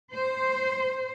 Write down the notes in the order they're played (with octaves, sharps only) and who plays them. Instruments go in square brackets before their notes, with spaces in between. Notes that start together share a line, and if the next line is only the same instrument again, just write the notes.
[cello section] C5